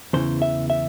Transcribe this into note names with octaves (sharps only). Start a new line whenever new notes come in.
E2 C#3 E3 C5
E5
E5